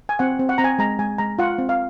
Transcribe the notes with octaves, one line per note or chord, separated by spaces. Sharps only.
G#5
C4 F#5
C4
F#5
C4 A#5
G#5
G#3 A#5
G#3 G#5
G#3 A#5
F4 F#5
C4
F5